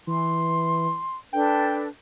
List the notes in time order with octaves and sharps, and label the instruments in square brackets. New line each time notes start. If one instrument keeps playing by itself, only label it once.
[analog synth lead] E3 [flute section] C6
[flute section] D4 A4 B4 [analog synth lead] G5